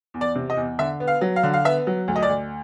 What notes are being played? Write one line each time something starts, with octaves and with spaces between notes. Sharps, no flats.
E2
D5
C3
D#5
E2
D3 E5
B3
F5
F#3
F5
D3
F5
B3 E5
F#3
D2
D#5
D5
D2